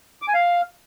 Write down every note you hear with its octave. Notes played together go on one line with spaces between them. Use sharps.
D6
G#5
F5